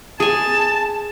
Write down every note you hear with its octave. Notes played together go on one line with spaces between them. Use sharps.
G#4 G#5 A5